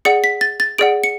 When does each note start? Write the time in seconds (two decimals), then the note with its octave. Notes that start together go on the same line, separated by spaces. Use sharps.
0.05 G#4 D5 F#5 C#7
0.24 B6
0.41 A6
0.60 A6
0.78 G#4 D5 F#5 D7
1.04 C#7